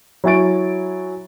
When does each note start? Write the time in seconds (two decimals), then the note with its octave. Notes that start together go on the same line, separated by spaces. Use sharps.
0.24 F#3 E4 G#5 C#6 A6 D7